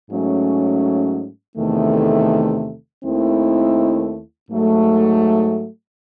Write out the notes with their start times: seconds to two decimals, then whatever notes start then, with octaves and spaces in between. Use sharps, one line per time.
0.11 G#2 F#3 A3 C#4
1.57 E2 C3 D#3 A3
3.04 D#2 D#3 A3 C4 E4
4.50 G#2 F#3 A3